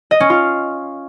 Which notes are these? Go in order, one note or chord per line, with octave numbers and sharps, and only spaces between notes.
D#5
C#4
F4